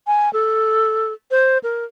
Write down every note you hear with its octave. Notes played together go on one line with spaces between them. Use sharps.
G#5
A4
C5
A#4